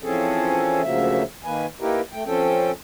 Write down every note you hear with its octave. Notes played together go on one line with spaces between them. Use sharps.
E3 F3 C4 C#4 G#4 A4
D2 C#3 F3 F#3 A#3 E5
D#3 A#3 B4 G#5
A#3 D#4 E4 G4 A#4 B4
A3 G5
F3 C4 C#4 A4 G5